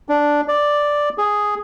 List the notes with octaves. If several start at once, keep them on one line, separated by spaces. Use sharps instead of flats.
D4
D5
G#4